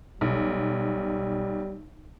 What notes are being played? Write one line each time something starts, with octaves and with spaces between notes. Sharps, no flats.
B1 G3